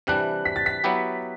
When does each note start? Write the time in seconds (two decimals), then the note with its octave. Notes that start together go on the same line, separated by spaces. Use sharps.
0.07 C3 E3 G3 D4 F#6
0.45 B6
0.56 A6
0.66 B6
0.84 F#3 B3 E4 G4